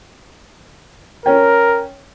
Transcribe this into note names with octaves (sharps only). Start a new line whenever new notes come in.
C#4 A#4 G5